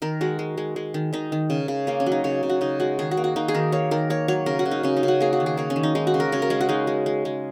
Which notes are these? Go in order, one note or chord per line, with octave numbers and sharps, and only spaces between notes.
D#3 A#4
G#3 F#4
G#3
G#3
G#3
D#3
D#3 D#4
D#3
C#3
C#3
A#3 C#4
C#4
F#3
D#4
C#3 C#5
C#3
F#4
C#3 D#4
G#3 F#4
D#3 G#4
F#4
A#3
F#4
A#3 D#4
G#4
D#3 A#4
A#3 C#5
D#3 A#4
A#3 C#5
F#3 C#5
C#3 A#4
F#4
C#3
D#4
C#3 C#4
D#4
C#3
F#4
A#3 G#4
F#4
D#3
G#4
A#3 C#5
C#4
D#3
D#4
G#3 D#4
F#4
C#3
A#4
C#3 C#5
A#4
G#3 G#4
F#4
G#3 D#4
G#3
G#3
G#3